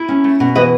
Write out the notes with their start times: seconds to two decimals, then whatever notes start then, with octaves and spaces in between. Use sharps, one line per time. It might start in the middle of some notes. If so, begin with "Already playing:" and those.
Already playing: E4
0.09 C#4
0.24 A3
0.40 B2
0.55 E3 B4 D#5